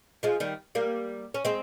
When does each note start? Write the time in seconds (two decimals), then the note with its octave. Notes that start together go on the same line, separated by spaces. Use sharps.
0.23 F3 G#3
0.40 D#3 G3
0.75 G3 A#3
1.34 C#4
1.45 G#3 C4